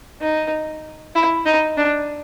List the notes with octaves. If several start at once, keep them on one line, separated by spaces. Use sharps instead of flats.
D#4
E4
D#4
D4